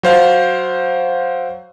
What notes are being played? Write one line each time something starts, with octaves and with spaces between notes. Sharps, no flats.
F#3 C5 F5